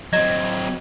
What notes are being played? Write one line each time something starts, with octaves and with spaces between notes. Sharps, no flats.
F#3 C4 D#5 G#6